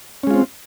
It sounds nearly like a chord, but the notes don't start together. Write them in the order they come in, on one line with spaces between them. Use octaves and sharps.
C#4 G#3 F4 C4